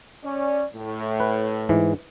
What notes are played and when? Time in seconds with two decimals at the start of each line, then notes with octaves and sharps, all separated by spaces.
0.24 C#4 D5
0.75 A2
1.20 B4
1.69 G#2 E3